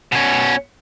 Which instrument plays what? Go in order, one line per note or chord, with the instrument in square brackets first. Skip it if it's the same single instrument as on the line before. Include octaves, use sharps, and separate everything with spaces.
[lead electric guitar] B2 C#4